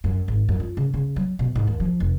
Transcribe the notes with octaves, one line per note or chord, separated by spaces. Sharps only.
F#2
G#1
F#2
F4
C#3
C#3
F#3
B2
G#2
D#2
F3
F1